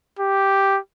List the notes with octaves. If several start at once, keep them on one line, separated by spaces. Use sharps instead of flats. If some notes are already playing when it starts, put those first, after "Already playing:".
G4